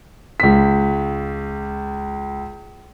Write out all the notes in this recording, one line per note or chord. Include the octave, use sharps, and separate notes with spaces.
C#2 B6